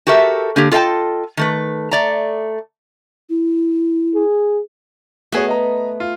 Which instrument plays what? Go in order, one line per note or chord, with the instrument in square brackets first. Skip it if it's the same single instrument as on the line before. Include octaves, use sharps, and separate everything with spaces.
[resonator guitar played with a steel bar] F#4 G4 A4 A#4 E5
D3 A#3 G4
F4 A4 D#5 F5 G5 A5
D#3 A3 B4
A3 D5 A#5
[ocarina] E4
[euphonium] G#4
[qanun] A3 B3 [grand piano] F#4 G#4 C#5
[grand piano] D#5 A#5
F4